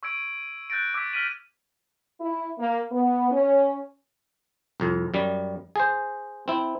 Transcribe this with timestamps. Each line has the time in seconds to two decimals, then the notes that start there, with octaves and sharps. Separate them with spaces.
0.03 C#6 E6 G#6 D7
0.70 F#6 G6 A6 A#6 D7
0.94 D6 E6 F#6 G#6 B6
1.13 F6 A#6 B6 D7 D#7 F#7
2.20 E4
2.59 A#3
2.92 B3
3.32 C#4
4.80 C2 F2
5.14 F#2 G3
5.76 G#4 C5
6.48 C4 E4